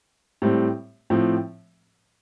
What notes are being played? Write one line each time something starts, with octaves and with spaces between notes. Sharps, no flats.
A2 G3 C4
A2 F3 C4